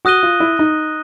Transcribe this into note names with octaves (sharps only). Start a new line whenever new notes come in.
F#4 D#6 F#6 A#6 D#7 G7
F4
E4
D#4